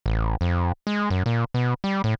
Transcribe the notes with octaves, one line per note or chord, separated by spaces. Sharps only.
A1
F2
G#3
F#2
A#2
B2
G3
A2